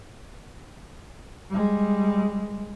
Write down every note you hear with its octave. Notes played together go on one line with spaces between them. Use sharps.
G3 G#3